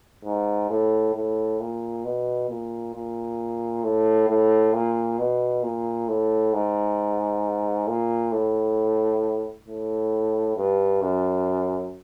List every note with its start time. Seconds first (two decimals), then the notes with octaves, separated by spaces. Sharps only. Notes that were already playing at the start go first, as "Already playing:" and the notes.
0.25 G#2
0.70 A2
1.15 A2
1.60 A#2
2.05 B2
2.50 A#2
2.94 A#2
3.84 A2
4.29 A2
4.73 A#2
5.18 B2
5.63 A#2
6.08 A2
6.53 G#2
7.88 A#2
8.32 A2
9.68 A2
10.57 G2
11.02 F#2